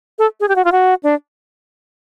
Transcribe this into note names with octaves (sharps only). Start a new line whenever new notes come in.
A4
G#4
G4
F#4
F4
F#4
D4